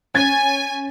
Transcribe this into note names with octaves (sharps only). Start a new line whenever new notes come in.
C#4 G#5 G#6 A6